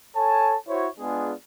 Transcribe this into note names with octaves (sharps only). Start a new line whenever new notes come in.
A4 C#5 G#5 A5
E4 F#4 C5 C#5
G#3 B3 D4 F4 G#4